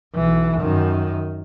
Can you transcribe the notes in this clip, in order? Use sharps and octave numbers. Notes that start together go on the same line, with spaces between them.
B1 E3
F#2 D#3